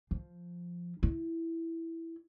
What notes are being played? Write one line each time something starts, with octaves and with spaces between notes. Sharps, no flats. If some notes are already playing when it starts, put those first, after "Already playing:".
F3
E4